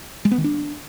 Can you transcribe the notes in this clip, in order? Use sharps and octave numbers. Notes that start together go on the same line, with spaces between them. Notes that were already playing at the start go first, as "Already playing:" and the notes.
G#3
B3
D#3
D4